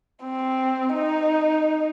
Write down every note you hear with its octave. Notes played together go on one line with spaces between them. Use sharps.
C4
D#4